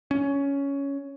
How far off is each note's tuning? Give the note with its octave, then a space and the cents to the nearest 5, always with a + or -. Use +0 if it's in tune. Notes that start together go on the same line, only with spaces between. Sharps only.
C#4 +10